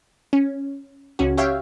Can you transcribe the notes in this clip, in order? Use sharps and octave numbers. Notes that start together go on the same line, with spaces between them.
C#4
C#2 C#4 F#4
G4 C#5 E5 F5 G5